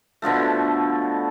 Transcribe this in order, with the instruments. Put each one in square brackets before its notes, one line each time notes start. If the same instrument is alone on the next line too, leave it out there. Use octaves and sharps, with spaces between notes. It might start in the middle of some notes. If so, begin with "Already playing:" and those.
[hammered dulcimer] B2 D3 F3 A3